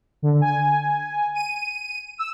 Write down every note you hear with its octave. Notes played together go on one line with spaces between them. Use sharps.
D3
G#5
D#7
E6